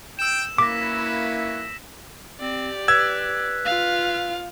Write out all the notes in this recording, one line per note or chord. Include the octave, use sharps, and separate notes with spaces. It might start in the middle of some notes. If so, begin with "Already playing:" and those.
G5 E6 E7
A#3 C#4 E4 F#4 B4 D6 A#6 B6
C4 G4 D5
B4 E6 G#6
F4 F5